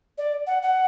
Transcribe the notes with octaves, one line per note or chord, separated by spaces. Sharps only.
D5
F#5
F#5